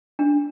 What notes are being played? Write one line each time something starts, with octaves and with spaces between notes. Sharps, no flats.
D4